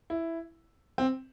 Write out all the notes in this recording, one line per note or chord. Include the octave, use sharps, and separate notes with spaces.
E4
C4